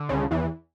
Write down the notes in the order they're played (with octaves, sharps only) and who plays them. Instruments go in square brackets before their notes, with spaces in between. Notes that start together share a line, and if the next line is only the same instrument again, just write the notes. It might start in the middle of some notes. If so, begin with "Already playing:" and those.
Already playing: [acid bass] D3
[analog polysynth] C#2 C#3
E2 E3